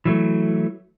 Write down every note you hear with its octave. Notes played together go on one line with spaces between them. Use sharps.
E3 F#3 A3